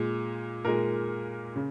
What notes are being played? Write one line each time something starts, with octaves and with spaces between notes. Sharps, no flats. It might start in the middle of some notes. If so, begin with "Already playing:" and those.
Already playing: A#2 G#3
A#2 G#3 A#4
C#3